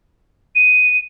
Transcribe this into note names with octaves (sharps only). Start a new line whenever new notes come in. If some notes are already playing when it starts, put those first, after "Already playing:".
D#7